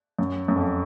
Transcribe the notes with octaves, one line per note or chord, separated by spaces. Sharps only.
F#2
F#2
F2